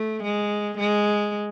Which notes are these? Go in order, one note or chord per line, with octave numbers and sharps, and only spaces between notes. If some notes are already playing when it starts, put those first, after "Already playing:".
Already playing: A3
G#3
G#3